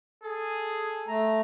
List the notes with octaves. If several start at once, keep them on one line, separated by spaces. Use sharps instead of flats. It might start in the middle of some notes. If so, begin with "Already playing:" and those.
G#4 A4
A3 A#5